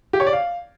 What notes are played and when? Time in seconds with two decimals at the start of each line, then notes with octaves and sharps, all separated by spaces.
0.13 G4
0.20 C#5
0.26 D5
0.33 F5